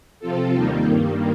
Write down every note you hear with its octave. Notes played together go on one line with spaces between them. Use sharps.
C3 F3 C4 F4 A4
D#2 D#3 G3 A#3 D#4
G2 D#3 G3 A#3